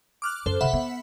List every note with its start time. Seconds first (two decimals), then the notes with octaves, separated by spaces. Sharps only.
0.22 D6 F6 F#6
0.46 F#2 A4 C5
0.61 C3 D#3 E5 F#5 B5
0.73 B3